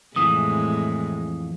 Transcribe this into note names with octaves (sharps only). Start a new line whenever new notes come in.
F2 A2 C3 E3 G#3 D#6